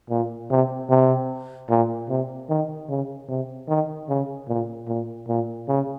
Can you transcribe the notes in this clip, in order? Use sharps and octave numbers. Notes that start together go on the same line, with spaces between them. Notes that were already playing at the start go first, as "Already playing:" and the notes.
A#2
C3
C3
A#2
C3
D#3
C#3
C3
D#3
C#3
A#2
A#2
A#2
C#3